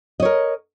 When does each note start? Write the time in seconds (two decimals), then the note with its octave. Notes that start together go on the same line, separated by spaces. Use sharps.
0.20 D#5
0.22 C#5
0.25 A#4